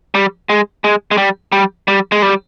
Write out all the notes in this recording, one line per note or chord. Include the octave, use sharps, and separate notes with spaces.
G3
G#3
G#3
G#3
G3
G3
G3
G#3
G3